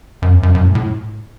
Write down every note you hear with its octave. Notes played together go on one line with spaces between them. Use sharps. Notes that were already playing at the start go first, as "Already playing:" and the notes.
F#2
E2
F#2
F#2
A2
A2